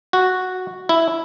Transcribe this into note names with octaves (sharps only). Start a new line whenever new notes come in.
F#4
E4